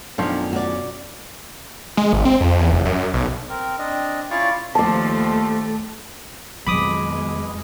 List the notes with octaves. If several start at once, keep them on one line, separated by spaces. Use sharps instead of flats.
F#2 B2 D#3 F3 C#4 D4 A4
F#4 D5
G#3
G#1
C4
F2
E2
F1
F#2
B1
C4 A#4
C4 D4 D#5
C#4 E4 F4 D5 F5 C#6
D#2 F3 A3 D5 A5
F2 B2 D#3 F#3 G#3 B5 D6 D#6